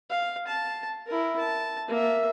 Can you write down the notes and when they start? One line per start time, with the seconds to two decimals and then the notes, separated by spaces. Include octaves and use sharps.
0.10 F5
0.47 A5
1.07 E4 A#4
1.39 A5
1.88 A#3 E5